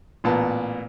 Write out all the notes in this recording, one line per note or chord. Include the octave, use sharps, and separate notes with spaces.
A1 A#2 B3 A5